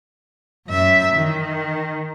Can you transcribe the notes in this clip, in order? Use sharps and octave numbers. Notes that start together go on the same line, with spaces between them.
F#2 E5
D#3